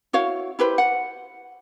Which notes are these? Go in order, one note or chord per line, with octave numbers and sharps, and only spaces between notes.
E4 F#4 C#5 F5
E4 G4 B4 C5
F#5